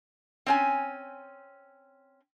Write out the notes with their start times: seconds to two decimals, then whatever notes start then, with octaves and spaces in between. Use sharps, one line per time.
0.46 C4 C#4 G#5